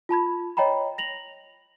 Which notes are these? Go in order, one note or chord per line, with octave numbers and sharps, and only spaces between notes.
F4 A5 B5 G#6
C#5 D#5 G5 A#5 B5
A#6 F7 F#7